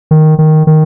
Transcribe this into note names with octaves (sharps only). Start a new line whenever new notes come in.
D#3
D#3
D#3